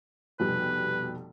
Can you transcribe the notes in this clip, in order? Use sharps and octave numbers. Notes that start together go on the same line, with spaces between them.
F1 B2 G3 B4